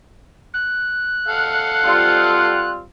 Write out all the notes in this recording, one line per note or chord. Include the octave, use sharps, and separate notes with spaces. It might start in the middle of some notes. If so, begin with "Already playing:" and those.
F#6
A4 F5 F#5
G3 C4 F4